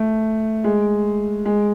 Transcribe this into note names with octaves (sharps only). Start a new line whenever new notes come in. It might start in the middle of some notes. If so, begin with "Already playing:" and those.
Already playing: A3
G#3
G#3